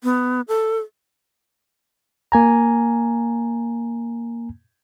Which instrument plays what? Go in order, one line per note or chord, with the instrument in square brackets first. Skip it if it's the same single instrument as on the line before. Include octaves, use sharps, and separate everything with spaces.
[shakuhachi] B3
A4
[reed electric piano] A#3 G#5 A#5